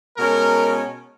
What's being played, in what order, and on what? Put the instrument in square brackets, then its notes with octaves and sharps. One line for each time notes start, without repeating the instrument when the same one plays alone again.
[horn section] B2 G#3 C#4 A#4